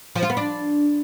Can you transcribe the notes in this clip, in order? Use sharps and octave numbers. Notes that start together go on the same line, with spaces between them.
F3
F4
B3
D4